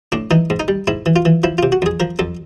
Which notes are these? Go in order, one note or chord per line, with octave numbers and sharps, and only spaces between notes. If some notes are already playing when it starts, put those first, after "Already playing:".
A2 D4
E3 D#4
G#2
D#4
G3
G#2 E4
E3
F4
E3
F3 E4
C3 F4
F#4
F2 G#4
F3 A#4
F2 A4